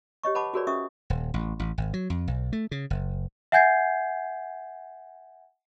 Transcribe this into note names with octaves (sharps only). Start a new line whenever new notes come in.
G4 C#5 D#5 C#6
B4 F#5 A5 B5 D6
F#4 G#4 A#4 B4 C#5 D5
C#4 E5 C#6 D#6
D#1
A1
A1
G#1
F#3
F2
B1
A3
C#3
F#1
E5 F#5 G#5 G6 G#6 C7